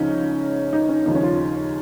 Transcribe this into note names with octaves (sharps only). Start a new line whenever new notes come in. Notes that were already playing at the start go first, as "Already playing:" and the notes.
Already playing: C#2 C#3 F3 C#4 D#4
D#4
C#4
D#2 C#3 F3 D#4
C#4
F4